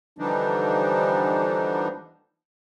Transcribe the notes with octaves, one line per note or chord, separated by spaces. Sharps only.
D3 E3 F3 G3 D4 D#4